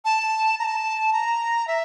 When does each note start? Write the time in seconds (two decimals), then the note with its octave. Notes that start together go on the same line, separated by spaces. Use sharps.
0.05 A5
0.59 A#5
0.64 A5
1.13 A#5
1.68 E5